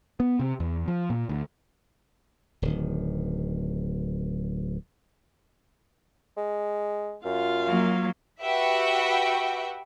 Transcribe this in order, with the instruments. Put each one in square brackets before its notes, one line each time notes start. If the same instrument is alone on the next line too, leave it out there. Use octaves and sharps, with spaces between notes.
[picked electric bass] B3
C3
E2
F3
A#2
D2
[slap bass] D1 D#3
[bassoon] G#3
[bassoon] F#2 [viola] F4 F5
[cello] F#3 A#3
[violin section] F#4 G4 B4 E5 F#5 G5